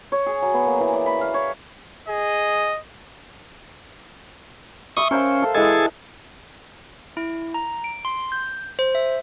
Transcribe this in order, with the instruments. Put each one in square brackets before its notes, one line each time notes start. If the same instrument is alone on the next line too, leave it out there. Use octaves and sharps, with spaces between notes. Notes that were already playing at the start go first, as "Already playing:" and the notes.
[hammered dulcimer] C#5
G#4
F#3
B3
A#3
E3
D5
B5
F5
C#5
[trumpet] G#4 [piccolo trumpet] D#5
[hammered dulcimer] E5 C6 [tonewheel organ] C#6 D#6
[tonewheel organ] C#4 [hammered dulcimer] A#4 C5 F5
[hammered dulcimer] A4
[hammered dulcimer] E3 G#3 [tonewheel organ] G#4 A4
[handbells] E4
A#5
D7
C6
G6
C5
E5